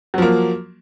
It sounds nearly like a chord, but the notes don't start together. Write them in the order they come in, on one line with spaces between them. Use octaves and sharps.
F#3 F3 A#3